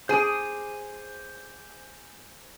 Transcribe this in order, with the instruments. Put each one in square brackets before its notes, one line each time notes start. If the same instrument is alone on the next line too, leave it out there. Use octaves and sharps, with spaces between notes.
[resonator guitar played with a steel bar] G#4 [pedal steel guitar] C5 G#5 D6